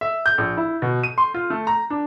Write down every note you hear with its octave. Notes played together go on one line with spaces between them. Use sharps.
E5
G6
A#1
E4
B2
D#7
C6
F4
A3
A#5
D4